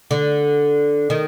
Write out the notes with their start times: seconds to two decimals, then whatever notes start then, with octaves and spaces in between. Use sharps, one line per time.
0.11 D3
1.10 D#3